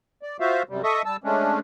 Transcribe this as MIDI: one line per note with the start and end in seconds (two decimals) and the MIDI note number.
0.23 0.37 74
0.40 0.63 65
0.40 0.63 66
0.40 0.63 72
0.40 0.63 76
0.40 0.63 77
0.69 0.82 42
0.69 0.82 48
0.69 0.82 55
0.83 1.02 69
0.83 1.02 75
0.83 1.02 76
0.83 1.02 85
0.83 1.02 87
1.05 1.17 55
1.05 1.17 81
1.05 1.17 88
1.24 1.60 56
1.24 1.60 57
1.24 1.60 61
1.24 1.60 62